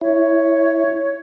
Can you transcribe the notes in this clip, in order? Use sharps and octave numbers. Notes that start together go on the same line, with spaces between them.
E4 C#5